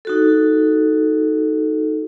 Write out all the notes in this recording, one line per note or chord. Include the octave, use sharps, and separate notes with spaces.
D#4 F#4 A4